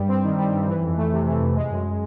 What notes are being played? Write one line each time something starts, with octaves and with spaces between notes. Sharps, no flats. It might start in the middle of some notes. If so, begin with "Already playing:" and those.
Already playing: G2 G3
C4
D#3
G3
G2
E3
F2
A3
C3
E3
F2
G#3
F#2